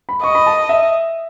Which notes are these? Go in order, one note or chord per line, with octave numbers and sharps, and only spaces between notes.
B5
D#5 C#6
B5
A5
E5